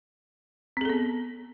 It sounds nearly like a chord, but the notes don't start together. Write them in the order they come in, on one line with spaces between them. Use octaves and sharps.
C4 G#4 A4 B3